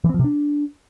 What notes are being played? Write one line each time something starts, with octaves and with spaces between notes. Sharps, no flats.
E3
C4
F3
C3
D4